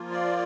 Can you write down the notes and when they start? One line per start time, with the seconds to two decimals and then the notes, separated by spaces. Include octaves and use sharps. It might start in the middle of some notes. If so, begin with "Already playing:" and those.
Already playing: F3 A#3 F4
0.12 D5